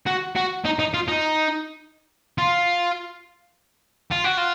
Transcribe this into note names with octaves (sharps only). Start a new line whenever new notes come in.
F#4
F#4
D#4
D#4
F4
D#4
F4
F4
F#4
F4